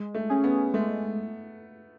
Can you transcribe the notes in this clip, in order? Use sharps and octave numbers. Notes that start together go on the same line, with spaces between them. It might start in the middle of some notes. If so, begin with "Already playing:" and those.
Already playing: G#3
A3
C#4 G#4
B3
G#3 A3